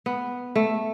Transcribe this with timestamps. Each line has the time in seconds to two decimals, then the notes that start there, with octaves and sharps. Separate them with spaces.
0.06 B3
0.56 A3